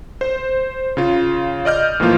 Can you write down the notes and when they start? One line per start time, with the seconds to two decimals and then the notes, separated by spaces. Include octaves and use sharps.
0.21 C5
0.97 C#3 F4
1.65 D5 D#5 F6 G6
2.00 A2 E3 F3 A#3 F4